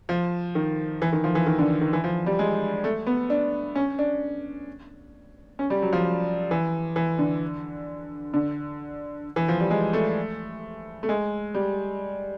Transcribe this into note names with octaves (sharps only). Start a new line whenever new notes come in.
F3
D#3
E3
D#3
F3
E3
D#3
D3
D#3
E3
F3
G3
G#3
A3
B3
D4
C#4
D4
C#4
G3
F#3
F3
E3
E3
D3
D3
E3
F3
G3
G#3
A3
A3
G#3
G3